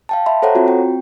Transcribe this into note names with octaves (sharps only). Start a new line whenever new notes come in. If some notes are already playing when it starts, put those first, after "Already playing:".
F5 G5 A5
E5 A5 B5 C6
A4 C5 C#5 F#5 A#5
C4 F4 F#4
C4 G5